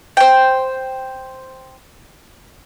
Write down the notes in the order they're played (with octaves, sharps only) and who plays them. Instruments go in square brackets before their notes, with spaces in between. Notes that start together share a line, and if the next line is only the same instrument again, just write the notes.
[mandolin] C5 G5